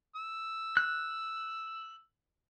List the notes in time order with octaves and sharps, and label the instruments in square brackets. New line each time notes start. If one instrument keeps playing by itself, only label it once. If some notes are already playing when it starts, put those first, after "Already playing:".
[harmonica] E6
[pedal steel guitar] F#6